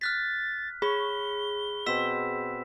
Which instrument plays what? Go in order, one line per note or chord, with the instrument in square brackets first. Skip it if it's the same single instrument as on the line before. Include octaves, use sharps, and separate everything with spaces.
[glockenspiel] F6 F#6 B6 [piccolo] A6
[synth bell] G#4 [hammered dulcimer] C#5 [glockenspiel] B5 [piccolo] G7
[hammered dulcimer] B2 C4 [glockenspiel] E6 B6 E7